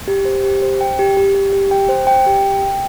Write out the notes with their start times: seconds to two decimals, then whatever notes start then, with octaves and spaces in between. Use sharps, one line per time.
0.08 G4
0.25 C5
0.44 G4
0.62 C5
0.81 G5
0.99 G4
1.17 G4
1.35 G4
1.53 G4
1.71 G5
1.89 C5
2.07 G5
2.26 G4
2.44 G5
2.63 G5